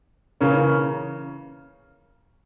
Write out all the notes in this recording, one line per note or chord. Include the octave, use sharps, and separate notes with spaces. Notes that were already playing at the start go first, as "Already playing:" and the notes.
C#3 E3 A#3 C#4